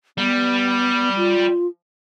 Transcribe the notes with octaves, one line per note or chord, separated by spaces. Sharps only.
G3 B3
F4